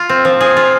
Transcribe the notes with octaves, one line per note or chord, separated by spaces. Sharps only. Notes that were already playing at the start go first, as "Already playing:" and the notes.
Already playing: F4
C4
F3
G#4
F4